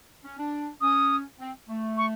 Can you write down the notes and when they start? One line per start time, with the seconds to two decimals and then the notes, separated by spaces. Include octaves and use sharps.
0.23 C#4
0.37 D4
0.81 C#4 D#6
1.39 C4
1.68 A3
1.97 C#6